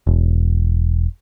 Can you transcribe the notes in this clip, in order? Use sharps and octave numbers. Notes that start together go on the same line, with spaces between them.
E1